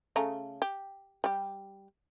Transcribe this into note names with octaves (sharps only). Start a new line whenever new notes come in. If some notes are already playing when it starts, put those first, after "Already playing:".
C#3 A3 A#5
G4
G3 G4